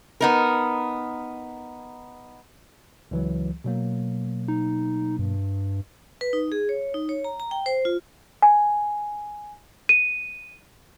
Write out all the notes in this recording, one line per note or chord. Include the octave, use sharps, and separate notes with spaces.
B3 D#4 A#4
C#2 E3 F#3
B2 F#3 A#3
D#4
G2
B4
D#4
G#4
C#5
D#4
C#5
A#5
A#5
G5
C5
F4
G#5
D#7